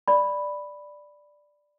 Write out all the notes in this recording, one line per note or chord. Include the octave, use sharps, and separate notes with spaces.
D5 B5